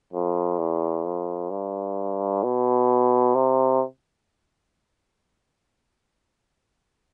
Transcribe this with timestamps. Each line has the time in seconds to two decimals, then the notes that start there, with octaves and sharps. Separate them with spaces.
0.13 F2
0.58 E2
1.04 F2
1.50 G2
2.43 B2
3.35 C3